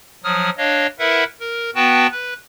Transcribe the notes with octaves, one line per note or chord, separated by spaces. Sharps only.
F3 F#3 D#6 F6
D4 C#5 D#5 F5
E4 A#4 B4 E5 F#5
A#4
B3 F#4 B4 G5 A5
B4